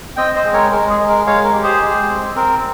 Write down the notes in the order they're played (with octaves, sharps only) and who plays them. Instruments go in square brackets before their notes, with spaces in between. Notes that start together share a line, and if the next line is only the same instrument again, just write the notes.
[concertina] C4 D#5 G5
C5 D#5
G#3
A#4 C#5
G#3 A#4
G#4
G#3
A#4
G#3 C#5 F5
A#4
G4
G#4 C5
G#3
C4
C4 A#4